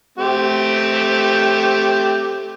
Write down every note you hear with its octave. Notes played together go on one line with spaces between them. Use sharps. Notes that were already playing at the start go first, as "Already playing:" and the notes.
A3 C4 G4